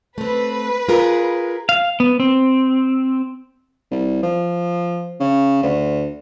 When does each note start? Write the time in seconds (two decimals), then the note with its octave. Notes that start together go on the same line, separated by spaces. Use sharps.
0.18 A3 C4 B4
0.89 F4 G#4 A#4
1.69 F5
2.00 B3
2.20 C4
3.91 C2
4.23 F3
5.20 C#3
5.63 D2